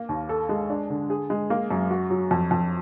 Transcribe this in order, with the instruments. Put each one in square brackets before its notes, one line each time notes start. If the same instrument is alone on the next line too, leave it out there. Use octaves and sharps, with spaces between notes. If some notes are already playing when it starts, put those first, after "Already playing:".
Already playing: [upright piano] A#3
D#2
A4
G#3
D4
D3
G#4
G#3
A#3
F#2
F#4
F#3
F2
F2